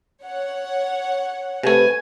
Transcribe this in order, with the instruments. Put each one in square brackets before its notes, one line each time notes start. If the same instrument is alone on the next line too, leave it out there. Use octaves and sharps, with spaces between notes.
[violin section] C#5 F#5
[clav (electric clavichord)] C3 A3 [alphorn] B4 [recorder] G#5